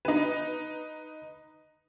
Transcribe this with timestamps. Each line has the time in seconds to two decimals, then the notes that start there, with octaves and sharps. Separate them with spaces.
0.05 D#4 B4